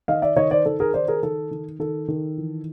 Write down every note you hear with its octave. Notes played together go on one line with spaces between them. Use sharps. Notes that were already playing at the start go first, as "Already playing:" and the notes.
D#3 D#5 F5
D5 E5
D#3 C#5 D#5
C5 D5
D#3 A4
G#4 A#4
D#3 C5 D5
G#4 A#4
D#3 A4
D#3
D#3 A4
D#3
E3